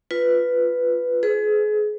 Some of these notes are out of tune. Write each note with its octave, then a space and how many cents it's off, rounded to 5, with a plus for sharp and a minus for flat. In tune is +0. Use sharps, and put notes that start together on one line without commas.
F4 +0 B4 +0
G#4 +30 B4 +40